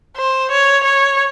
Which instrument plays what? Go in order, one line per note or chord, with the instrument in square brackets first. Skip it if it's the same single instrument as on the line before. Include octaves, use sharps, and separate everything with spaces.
[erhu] C5
C#5
C#5